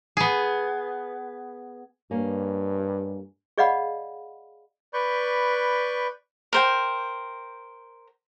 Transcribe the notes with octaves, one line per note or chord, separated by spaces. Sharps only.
B3 G#4
G2 A#3 C#4
G#4 D5 D#5 F5 F#5 B5
B4 D5 B5 C#6 G6
A#4 C5 G5